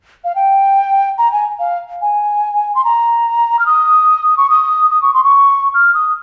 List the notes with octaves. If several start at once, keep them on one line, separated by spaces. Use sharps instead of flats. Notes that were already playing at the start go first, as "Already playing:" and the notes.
F5
G5
A#5
G#5
F5
G#5
C6
A#5
F6
D#6
C#6
D#6
D#6
C#6
C6
C#6
F6
D#6